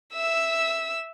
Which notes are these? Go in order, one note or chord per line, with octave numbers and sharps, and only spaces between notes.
E5 E6